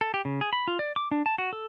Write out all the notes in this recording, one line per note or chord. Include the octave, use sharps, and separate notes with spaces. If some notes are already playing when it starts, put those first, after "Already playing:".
A4
G4
C#3
G#4
B5
F4
D5
D6
D4
A5
F#4
A4